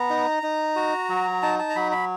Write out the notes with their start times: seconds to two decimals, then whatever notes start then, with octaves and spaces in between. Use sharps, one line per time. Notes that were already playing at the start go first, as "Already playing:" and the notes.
Already playing: B3 A#5
0.10 D#4
0.43 D#4
0.76 F#4
1.09 F#3
1.42 D#4 A5
1.59 A5
1.70 A#5
1.76 F#3 B5
1.92 B5